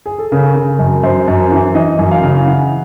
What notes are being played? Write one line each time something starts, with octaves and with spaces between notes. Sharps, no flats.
G#4
A4
C#3 A#4
C#3
F#2
F#2 C5
F#2
E3
E3 D#5
F#2
F5
C#3
E3 F#5